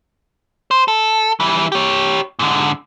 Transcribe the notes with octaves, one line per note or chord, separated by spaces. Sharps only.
C5
A4
E3 G3
G4 C#5
G#2 D3